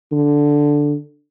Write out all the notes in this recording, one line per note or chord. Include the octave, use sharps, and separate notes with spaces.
D3